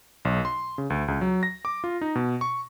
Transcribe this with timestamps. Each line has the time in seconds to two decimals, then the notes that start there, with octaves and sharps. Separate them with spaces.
0.25 B1
0.45 C6
0.78 C#3
0.90 D2
1.08 C#2
1.21 F#3
1.43 A#6
1.65 D6
1.84 F4
2.01 D#4
2.15 B2
2.41 C#6